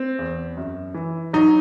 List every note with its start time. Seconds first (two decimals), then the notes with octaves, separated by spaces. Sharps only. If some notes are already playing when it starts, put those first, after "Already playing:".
Already playing: C4
0.19 E2
0.57 F#2
0.94 E3
1.33 F#3 D#4